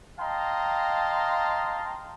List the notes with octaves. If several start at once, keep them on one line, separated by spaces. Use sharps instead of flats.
D#5 F5 G5 A5 A#5 C6